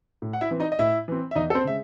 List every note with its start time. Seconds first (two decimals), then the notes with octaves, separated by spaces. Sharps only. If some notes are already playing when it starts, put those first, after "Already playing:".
0.22 A2
0.33 F#5
0.41 E4 E5
0.51 E3 C4
0.60 D#4 D#5
0.72 D#5
0.79 A2 E4 E5
1.08 E3 C4
1.31 E5
1.35 E2 D#4 D#5
1.50 A4
1.55 C4 C5
1.64 C#3 G#3 E5